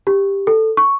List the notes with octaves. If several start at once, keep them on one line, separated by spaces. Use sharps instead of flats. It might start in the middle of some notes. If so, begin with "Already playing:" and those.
G4
A4
C#6